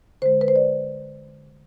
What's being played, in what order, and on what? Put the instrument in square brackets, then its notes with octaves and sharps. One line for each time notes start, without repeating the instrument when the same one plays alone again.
[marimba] D3 G#3 C5
B4
C5
D5